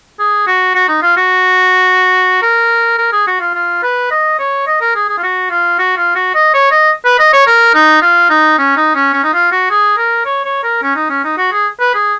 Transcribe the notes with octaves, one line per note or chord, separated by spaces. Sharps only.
G#4
F#4
F#4
D#4
F4
F#4
A#4
A#4
G#4
F#4
F4
F4
B4
D#5
C#5
D#5
A#4
G#4
G#4
F4
F#4
F4
F#4
F4
F#4
D#5
C#5
D#5
B4
D#5
C#5
A#4
D#4
F4
D#4
C#4
D#4
C#4
C#4
D#4
F4
F#4
G#4
A#4
C#5
C#5
A#4
C#4
D#4
C#4
D#4
F#4
G#4
B4
G#4